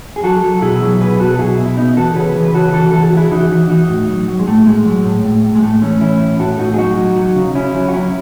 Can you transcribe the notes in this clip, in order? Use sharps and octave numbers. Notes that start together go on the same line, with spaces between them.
G#4
F#3 F#4 A4
F#3
B2 E4 G#4
F#3
B2 G#4 B4
B2 F#4 A4
A4
F#3 E4 G#4
B2
E4
C#3 B3 D#4
E3 F#4 A4
C#3 G#4 B4
E3
B4
C#3 F#4 A4
E3 F#4 A4
E3 A4
G#4
F#4
C#3 E4 G#4
E3 D#4 F#4
E3
E3 D#4 F#4
A2
F#3
F#3
G#3
A2 A3
A2 G#3
F#3
A2
A2
A2
G#3
A2 A3
E3 A3 C#4
E3 C#4 E4
A2
A2 F#4 A4
A2 D#4 F#4
G#4
F#3 D#4 F#4
F#3
F#3
C#3
C#3 C#4 E4
F#3
F#4
F#3 C#4 E4